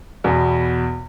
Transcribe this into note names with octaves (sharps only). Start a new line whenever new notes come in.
E2 B2